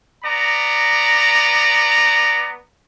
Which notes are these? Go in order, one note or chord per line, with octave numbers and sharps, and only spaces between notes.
B3 D5 A#5